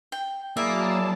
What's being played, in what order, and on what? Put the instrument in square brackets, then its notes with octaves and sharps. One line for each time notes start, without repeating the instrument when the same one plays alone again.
[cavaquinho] G5
[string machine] F#3 A5 [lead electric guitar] A#3 [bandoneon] E4 G#4 D5 [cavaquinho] E5